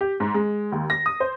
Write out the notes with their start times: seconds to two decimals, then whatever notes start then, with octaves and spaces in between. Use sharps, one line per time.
0.01 G4
0.20 G#2
0.34 G#3
0.72 D#2
0.90 A#6
1.06 D#6
1.20 C5